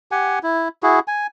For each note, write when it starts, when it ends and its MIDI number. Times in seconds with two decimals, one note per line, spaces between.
0.12 0.39 67
0.12 0.39 78
0.12 0.39 80
0.43 0.68 64
0.83 0.99 64
0.83 0.99 66
0.83 0.99 68
1.08 1.27 80